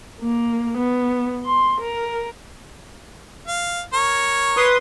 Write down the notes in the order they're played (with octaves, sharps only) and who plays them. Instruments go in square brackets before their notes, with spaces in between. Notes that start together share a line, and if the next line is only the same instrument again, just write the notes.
[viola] A#3
B3
C6
A#4
[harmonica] F5
A#4 C#5
[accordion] B4 C6 D#6